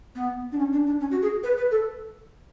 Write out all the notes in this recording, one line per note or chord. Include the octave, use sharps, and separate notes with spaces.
B3
D4
C#4
D4
D4
C#4
F#4
G#4
B4
B4
A4